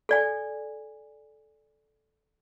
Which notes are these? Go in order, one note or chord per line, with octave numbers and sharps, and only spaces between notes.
A4 D5 G#5